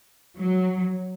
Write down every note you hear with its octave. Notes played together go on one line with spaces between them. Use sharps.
F#3